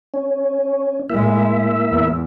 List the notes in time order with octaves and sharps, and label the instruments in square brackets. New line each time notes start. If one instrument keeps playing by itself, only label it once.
[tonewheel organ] C#4
[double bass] A2 G#3 [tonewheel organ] A#3 E4 E5
[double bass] E2